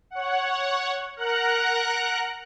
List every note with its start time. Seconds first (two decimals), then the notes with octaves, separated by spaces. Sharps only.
0.11 C#5 F#5
1.17 A#4 F#5 A#5 F#6